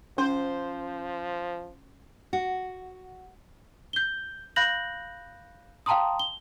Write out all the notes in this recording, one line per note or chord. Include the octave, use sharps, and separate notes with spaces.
F3 C#4 C5
F#4
G6 G7
F5 B5 F#6 G6 A#6 F#7
F5 G5 A5 A#5 C6 D#6
G7